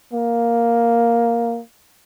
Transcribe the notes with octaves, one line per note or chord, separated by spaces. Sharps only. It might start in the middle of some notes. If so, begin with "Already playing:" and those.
A#3